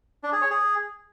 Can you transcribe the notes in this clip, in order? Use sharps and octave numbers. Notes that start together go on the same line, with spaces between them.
D4
G#4
C#5
G#4